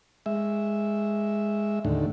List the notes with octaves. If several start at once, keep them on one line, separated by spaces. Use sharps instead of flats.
G#3 E5
D#2 A2 D3